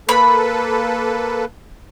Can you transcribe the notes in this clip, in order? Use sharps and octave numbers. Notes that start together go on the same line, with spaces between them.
A#3 A4 B4 B5